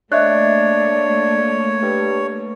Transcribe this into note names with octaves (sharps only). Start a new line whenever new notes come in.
A3 A#3 D4 C#5 D#5 E5 F#6
G2